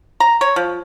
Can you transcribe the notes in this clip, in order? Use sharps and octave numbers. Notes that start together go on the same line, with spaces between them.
A#5
C#5
F3